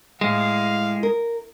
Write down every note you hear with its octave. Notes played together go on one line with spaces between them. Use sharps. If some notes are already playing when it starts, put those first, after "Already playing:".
A2 G#3 F5
A#4